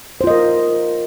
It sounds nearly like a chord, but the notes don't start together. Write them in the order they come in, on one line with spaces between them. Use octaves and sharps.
C5 F4 D#5 A#4